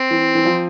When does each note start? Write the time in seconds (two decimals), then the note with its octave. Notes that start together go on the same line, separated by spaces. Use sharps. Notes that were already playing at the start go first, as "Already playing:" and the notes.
Already playing: C4
0.11 E3
0.35 E3
0.45 F3